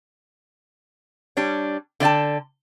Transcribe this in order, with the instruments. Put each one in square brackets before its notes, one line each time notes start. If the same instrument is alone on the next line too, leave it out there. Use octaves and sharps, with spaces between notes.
[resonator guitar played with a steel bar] G3 D4 C#5
D3 B3 D5 G5 A5